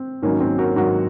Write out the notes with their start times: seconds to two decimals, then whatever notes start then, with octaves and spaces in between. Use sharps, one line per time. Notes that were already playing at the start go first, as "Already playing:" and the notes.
Already playing: C4
0.22 G#2 D#3 F#3 A#3 C#4
0.40 C4
0.58 F#4 A#4
0.76 G#2 D#3 F#3 F#4 A#4